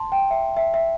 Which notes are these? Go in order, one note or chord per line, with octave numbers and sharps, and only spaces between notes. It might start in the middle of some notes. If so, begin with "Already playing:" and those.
Already playing: A5 C6
G5
E5
E5
E5